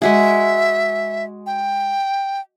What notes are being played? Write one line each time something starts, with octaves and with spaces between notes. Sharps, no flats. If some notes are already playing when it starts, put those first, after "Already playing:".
G#3 F#4 G#4 E5
G5